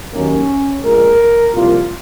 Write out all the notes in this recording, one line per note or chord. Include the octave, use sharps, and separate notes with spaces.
D#2 D#3 F#3 A#3 C#4
A#1 A#2 G#3 A#4
C2 A#2 F3 A#3 F4